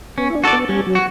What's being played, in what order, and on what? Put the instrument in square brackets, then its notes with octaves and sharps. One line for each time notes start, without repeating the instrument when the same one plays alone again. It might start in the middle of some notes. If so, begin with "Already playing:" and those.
[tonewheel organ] B3 [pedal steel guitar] C#4
[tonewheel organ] E4
D4
[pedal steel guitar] F#4 A4 D5
[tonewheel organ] B3
[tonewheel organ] G3 [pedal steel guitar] C#4
[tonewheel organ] F#3
[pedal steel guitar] F#4